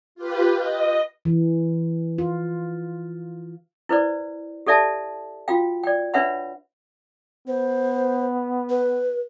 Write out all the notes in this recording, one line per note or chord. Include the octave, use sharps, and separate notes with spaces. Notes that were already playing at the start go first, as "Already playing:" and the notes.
F4 G4 B4
D#5
E3
F4
E4 B4 C5 D5
G4 A4 D5 E5 A5
F4 F#4 F5 G5
D5 G5
D4 B4 C#5 E5 F#5 B5
B3 C5
B4